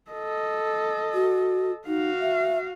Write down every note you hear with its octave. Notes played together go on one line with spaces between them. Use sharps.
A4 D#5
F#4
D#4 F#4 F5
E5